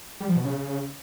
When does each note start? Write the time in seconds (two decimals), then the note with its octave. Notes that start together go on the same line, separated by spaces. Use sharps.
0.21 G3
0.29 F3
0.36 B2
0.44 C#3